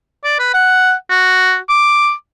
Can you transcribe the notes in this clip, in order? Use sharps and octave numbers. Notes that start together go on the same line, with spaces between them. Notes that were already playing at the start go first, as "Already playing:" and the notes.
D5
B4
F#5
F#4
D6